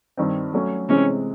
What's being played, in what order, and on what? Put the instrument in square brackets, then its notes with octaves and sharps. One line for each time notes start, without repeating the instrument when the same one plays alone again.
[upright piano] G2 D#3 G3 C4
F#3 A3 C#4
[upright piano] C3 E3 G#3 C4 [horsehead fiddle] C#4